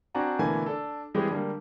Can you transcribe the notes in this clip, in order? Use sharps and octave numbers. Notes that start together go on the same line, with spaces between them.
C4 D4 F#4 F#5 G#5 A#5
B2 D3 E3 A3 A#3 G#5
D4 A4
E3 G3 G#3 C4 G4 G#4
D3 G3 G#3 A#3